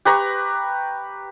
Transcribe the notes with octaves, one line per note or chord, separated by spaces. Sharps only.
G4 B4 A#5 C#6